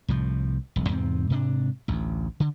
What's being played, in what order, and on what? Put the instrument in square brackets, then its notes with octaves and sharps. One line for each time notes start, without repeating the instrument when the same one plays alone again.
[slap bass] C2 A2 F3
E1 B1
E2 G#2 C3 C4
G#2 C3 C4 D4
A1 D2
D3